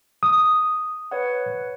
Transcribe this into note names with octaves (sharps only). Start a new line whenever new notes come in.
D#6
B4 C#5 F#5